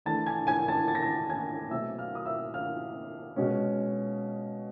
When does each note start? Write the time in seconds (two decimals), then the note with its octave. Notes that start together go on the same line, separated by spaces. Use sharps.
0.06 E3 A3 D4 A5 A6
0.26 G#5 G#6
0.47 G#5 G#6
0.68 A5 A6
0.88 A6
0.95 A#6
1.03 A5 A6
1.30 G#5 G#6
1.71 B2 F#3 A3 C4 E5 E6
1.99 F5 F6
2.15 D#6
2.26 E5 E6
2.54 F5 F6
3.36 B2 G#3 C#4